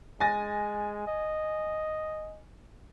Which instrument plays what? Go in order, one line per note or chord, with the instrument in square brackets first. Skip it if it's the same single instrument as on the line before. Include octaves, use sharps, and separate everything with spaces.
[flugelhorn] G#3 [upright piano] G#5 A6 A#6
[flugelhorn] D#5